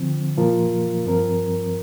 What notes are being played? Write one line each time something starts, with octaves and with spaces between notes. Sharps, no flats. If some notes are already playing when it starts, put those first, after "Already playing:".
Already playing: D3 F3 C4
A#2 F3 A#3 F4 A#4
G2 F3 C4 A#4